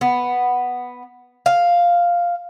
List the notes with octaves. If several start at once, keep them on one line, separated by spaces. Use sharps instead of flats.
B3
F5